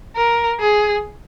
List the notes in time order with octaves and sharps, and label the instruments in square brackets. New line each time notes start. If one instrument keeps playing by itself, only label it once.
[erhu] A#4
G#4